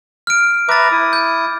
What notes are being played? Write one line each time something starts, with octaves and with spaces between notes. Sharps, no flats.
F6 D7
B4 E5 A#5 D6 A6
E4 D#6
G6